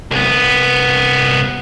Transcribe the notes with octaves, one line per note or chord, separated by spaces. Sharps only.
C2 B3